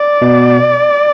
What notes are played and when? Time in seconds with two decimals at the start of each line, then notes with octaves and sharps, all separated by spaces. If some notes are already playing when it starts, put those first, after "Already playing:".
Already playing: D5
0.22 B2